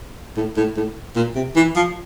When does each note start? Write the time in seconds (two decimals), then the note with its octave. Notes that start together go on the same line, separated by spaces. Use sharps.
0.37 A2
0.56 A2
0.76 A2
1.16 A#2
1.35 C3
1.56 E3
1.76 F3